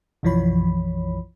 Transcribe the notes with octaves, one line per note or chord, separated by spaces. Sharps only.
B1 F#2 E3 F3 C#5 B5